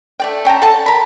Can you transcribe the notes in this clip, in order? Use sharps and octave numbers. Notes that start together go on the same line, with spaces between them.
A3 D5 G5
C#4 G5 A5 A#5
A4 F#5 A5
A#4 B5